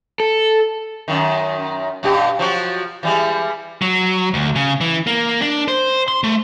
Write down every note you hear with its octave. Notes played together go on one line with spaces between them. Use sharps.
A4
F#2 D#3
G2 B2 G4
F3 F#3 F#4
E3 G3 G#3
F#3
D2
C#3
E3
A#3
D4
C5
C6
A3